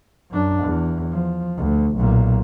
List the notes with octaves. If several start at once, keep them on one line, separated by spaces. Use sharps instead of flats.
F#2 D4
E2
F3
D2
B1 A#2